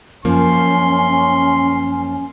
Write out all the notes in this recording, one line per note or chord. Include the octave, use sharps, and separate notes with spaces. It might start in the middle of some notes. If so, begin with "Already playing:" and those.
F#2 F3 A#3 C#4 C6